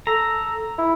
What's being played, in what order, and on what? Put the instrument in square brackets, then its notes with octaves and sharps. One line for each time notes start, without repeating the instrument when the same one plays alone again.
[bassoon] A4 [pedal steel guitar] A#5
[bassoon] E4